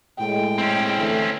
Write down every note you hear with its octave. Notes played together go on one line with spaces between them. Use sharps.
A2 G#3 G5
C4 C#4
D3 E3 A3